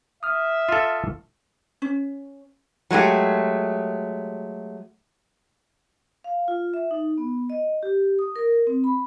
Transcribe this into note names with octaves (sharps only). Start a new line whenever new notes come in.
E5 D#6 F6
F4 A4
C#4
F#3 G#3 A3 G4
F5
F4
E5
D#4
B3
D#5
G4
D#6
A#4
C4
B5